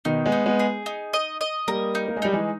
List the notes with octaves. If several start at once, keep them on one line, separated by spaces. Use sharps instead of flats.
B2 D#3 D#4
G#3 B3
D#4
G#3 B3
G#4
D#4
D#5
D#5
G3 A#3 A#4
D#4
A#3
G#3
G3 D#4
E3 G#3